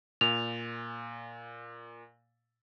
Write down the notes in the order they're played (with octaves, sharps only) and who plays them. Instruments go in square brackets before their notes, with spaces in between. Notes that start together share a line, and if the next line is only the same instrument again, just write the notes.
[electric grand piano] A#2 [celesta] F7